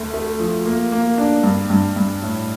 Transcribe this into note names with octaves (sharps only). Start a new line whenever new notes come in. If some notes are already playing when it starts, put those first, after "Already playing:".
Already playing: D2 A3
A3
F3
A#3
A#3
D4
G2
G2
G2
A2